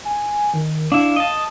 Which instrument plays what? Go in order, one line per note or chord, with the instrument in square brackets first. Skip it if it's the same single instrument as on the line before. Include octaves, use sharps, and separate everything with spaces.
[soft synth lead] G#5
D#3
[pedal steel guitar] D4 E4 [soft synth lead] F5
[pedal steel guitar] D#5 A5